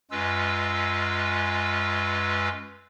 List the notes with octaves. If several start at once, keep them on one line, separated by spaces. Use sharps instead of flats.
F#2 G#3 C#4 F4 B4 E6